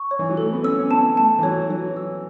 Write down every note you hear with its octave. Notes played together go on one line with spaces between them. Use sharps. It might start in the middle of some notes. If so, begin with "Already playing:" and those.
Already playing: C#6
C#5
E3
F#3
A3 A4
B3
C#4 E6
C#4
B3 A5
A3 A5
E3
F#3 C#5
F#3 C#5
E6